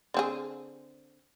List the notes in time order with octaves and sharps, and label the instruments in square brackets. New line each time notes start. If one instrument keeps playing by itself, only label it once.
[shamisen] D3 C4 G#4